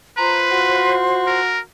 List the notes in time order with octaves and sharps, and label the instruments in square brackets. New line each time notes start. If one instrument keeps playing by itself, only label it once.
[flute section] F4 C5 C6 [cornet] B4 [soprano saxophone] A#5
[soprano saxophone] F#4
[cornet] A#4